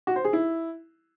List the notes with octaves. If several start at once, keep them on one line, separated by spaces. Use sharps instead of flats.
F#4
C5
G#4
E4